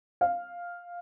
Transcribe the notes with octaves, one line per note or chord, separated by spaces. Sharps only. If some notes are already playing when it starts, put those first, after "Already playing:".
F5